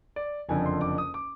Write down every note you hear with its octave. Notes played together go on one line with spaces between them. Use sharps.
D5
F#1 F2 D3 G#5
C6
D6
D#6
D6